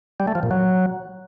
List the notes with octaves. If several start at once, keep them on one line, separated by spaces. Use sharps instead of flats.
G3
A3
F3
A#2
F#3